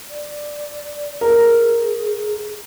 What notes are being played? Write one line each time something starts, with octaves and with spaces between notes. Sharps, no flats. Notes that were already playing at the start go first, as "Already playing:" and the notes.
D5
G#4 A#4